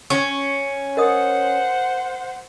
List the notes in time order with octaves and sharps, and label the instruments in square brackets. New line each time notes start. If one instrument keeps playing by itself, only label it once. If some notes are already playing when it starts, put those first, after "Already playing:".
[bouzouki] C#4 [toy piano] C#6
[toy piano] A#4 D#5 D#6 [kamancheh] C5 F#5